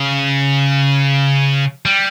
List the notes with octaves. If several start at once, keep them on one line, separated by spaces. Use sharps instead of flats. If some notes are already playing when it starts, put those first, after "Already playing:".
Already playing: C#3
G3